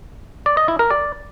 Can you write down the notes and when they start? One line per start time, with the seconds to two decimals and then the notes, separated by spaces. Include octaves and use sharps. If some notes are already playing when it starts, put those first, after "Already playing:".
0.46 D5
0.57 D#5
0.68 E4
0.79 A#4
0.90 D5